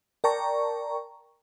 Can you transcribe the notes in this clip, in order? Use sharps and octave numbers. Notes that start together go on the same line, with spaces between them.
A#4 D5 G5 A5 A#5 C#6